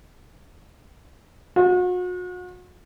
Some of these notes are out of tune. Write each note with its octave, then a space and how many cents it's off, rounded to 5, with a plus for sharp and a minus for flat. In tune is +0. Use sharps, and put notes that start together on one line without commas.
F#4 -40